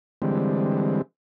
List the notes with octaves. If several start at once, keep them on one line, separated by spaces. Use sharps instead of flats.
D3 E3 G3 G#3 C4